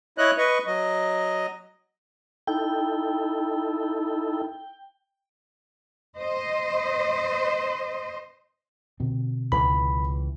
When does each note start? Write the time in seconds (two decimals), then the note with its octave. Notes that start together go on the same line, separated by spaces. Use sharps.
0.18 E4 C#5 D#5 F#6
0.38 B4 D#5 C#6
0.66 F#3 D#5
2.47 D#4 E4 A4 G5
6.18 C5 D#5
9.00 B2 D3 C4
9.52 C#2 A2 E3 B5